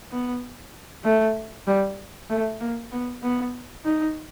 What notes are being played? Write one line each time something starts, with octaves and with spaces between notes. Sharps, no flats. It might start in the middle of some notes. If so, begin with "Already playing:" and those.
B3
A3
G3
A3
A#3
B3
B3
D#4